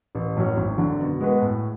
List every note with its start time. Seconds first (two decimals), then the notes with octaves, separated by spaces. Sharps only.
0.15 A1
0.36 A2 F#3 C#4
0.57 G#1
0.78 F#2 D3
0.99 B2
1.21 G#3 B3 F#4 B4
1.42 A2